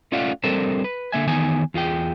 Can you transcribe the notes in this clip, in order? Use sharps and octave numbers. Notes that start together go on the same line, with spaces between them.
A3 C#4 F4 D5 F5 F#5
G3 C4 D4 A4 A#4 C5
B4
D3 A#3 E5 G#5
D#3 E3 B3 D#4 G#5
E2 F4 G#4 G5